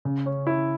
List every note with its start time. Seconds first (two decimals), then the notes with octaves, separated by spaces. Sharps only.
0.05 C#3
0.26 C#4
0.47 E4